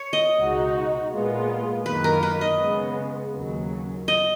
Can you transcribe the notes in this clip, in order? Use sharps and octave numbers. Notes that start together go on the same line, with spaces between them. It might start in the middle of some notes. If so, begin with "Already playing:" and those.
Already playing: C#5
D#5
C#2 B2 G#3 D#4 F#4
A#2 G#3 B3 F4
F#2 D#3 A#3 B4
A#4
B4
D#5
C#3 G#3 B3
D#2 C#3 F#3
D#5